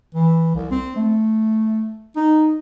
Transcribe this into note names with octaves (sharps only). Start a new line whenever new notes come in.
E3
C2
C4
A3
D#4